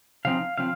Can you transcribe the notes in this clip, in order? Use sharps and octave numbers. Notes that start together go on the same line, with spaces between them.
C#3 F3 C4 D#4 F5
C#3 F3 C4 F5